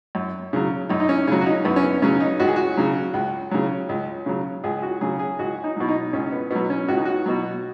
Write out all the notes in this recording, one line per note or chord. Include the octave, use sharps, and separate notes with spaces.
F#2
C#3 F#3
F#2 D#4
D#4
C#4
C#3 F#3 C#4
F#4
D#4
F#2 B3
C#4
B3
C#3 F#3 C#4
D#4
C#2 F#4
G#4
F#4
C#3 F#3
C#2
C#3 F#3
C#2
C#3 F#3
C#2 G#4
F#4
C#3 F#3 G#4
G#4
C#2 F#4
D#4
B2 F#3
D#4
C#2 C#4
B3
B2 F#3 B3
C#4
C#2 F#4
D#4
F#4
B2 F#3